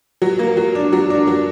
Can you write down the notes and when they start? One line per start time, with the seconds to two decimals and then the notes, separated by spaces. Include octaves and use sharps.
0.22 F#3
0.39 A#3
0.57 F#3
0.75 D4
0.93 F#3
1.10 D4
1.27 F#3